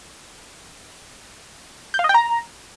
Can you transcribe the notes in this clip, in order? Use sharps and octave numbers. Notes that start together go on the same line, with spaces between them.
G6
F5
D#5
G5
A#5